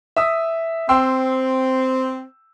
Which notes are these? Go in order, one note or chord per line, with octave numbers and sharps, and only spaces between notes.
E5 D#6 E6
C4 G5 C6 E6